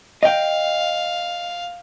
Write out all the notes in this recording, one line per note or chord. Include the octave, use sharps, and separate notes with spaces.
D#5 F5 G5